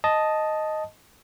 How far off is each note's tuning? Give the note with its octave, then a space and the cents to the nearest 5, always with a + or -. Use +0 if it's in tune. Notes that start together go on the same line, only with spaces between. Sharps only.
D#5 +0 A5 -5